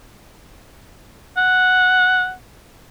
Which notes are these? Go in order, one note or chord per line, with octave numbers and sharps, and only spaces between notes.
F#5